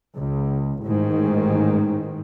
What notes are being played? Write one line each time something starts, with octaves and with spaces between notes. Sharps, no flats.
C#2
A1 G#2 D#3